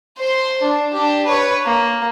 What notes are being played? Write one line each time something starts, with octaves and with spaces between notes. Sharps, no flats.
C5 C6
D4
D4 G4
B4 C#5
A#3